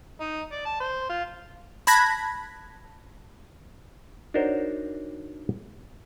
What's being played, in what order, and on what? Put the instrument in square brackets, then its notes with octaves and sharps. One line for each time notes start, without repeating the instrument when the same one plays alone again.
[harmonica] D#4
D5
A5
C5
F4
[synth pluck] A5 B5 F#6 G#6 A#6 B6
[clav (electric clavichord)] D4 D#4 F#4 A#4 C5 C#5